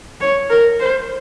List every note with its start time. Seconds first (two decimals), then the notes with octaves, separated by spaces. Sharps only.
0.21 C#5
0.50 A#4
0.79 C5